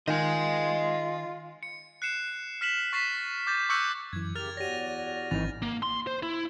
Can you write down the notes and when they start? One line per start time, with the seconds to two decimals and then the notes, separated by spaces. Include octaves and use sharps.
0.08 D#3 F4 D#5 G#5
1.63 C#7
2.02 F#6 C7 C#7 E7
2.61 F6 B6 E7 F#7
2.93 C#6 A6 B6 C7 E7
3.47 D6 G6 A6
3.69 C#6 D6 E6 F#6 G6 C#7
4.13 F#2 E3 G#6
4.35 C#3 G4 A#4 F6 A6 F7
4.57 E2 F#4 G4 C#5 D5 A#6 D#7
5.31 G#1 E3 C4 D#4 A6 F7
5.62 A#3
5.82 C6
6.07 C5
6.23 E4